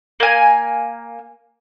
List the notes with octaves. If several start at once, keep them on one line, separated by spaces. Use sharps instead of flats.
A#3 G#5